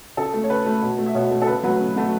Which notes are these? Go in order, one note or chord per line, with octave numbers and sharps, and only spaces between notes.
C#3 A4
A3
C#5
C#3 B4
A3
B2
A3
E5
B2 C#5
A3
A4
C#3 B4
F#3 A3 B4
C#3
F#3 A3